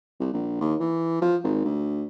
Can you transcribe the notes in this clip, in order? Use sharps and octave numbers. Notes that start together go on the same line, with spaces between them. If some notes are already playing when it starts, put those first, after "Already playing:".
C2
A#1
D#2
E3
F3
G#1
D2